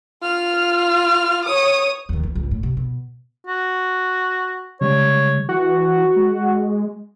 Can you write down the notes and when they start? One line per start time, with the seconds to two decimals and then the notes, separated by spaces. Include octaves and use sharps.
0.22 F4 F6
1.45 C#5 D#6
2.09 D#2 D#3
2.23 E3
2.35 G#1 C#2
2.51 A2
2.63 C3
2.77 B2
3.47 F#4
4.81 C#3 G3 G#3 C#5
5.49 E3 F#4
6.16 G#3